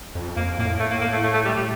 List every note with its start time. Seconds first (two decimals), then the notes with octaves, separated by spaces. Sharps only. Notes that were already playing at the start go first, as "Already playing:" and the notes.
0.15 F2
0.36 F2 A#3
0.59 A2 A#3
0.80 A3
0.91 A#3
1.01 A#3
1.12 A3
1.23 A3
1.34 A3
1.45 G3
1.56 G3